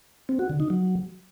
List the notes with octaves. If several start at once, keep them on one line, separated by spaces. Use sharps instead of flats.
C4
F#4
D3
D#4
F#3